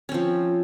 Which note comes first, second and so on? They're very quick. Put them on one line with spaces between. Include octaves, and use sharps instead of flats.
C#4 C4 F3